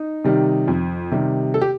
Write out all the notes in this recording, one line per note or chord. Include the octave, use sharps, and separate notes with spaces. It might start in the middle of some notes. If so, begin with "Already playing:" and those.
Already playing: D#4
C3 D#3 G3
F2
C3 D#3 G3
A4
G4